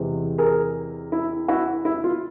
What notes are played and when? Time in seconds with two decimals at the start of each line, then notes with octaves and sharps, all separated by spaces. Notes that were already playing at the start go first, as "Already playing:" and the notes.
Already playing: E2 C3 E3 G#3 C4
0.38 G#4 A#4
1.12 E4
1.48 E4 F#4
1.85 E4
2.04 F4